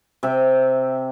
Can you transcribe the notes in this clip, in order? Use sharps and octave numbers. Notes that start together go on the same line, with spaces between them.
C3 E5 G5